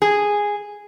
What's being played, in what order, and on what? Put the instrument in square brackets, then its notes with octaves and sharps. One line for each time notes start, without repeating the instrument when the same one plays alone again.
[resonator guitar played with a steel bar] G#4